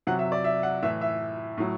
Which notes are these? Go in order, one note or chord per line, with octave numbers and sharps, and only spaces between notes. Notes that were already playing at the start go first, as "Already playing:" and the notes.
C3 F#3 F#5
E5
D5
E5
F#5
A2 E3 E5
E5
A2 F#3